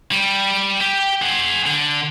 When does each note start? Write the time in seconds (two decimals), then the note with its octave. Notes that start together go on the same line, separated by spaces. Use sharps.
0.12 G3
0.81 G4
1.22 G#4 F#5
1.66 D3